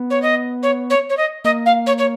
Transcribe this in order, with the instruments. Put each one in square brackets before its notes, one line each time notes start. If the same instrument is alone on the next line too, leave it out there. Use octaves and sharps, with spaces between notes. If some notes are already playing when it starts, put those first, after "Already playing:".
Already playing: [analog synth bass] B3
[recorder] C#5
D#5
C#5
C#5
C#5
D#5
[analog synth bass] A#3 [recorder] D#5
[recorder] F5
C#5
C#5